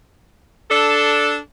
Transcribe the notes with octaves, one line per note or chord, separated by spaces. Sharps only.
D4 A4